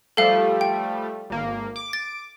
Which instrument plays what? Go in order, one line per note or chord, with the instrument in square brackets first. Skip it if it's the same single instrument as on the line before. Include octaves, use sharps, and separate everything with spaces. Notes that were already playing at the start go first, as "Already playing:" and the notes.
[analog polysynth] F3 G3 A3 [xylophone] A4 F5
[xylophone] G5
[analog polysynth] G#1 A#3
D6
[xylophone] A6